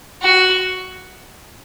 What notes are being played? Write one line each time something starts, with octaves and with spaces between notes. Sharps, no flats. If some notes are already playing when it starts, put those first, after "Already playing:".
F#4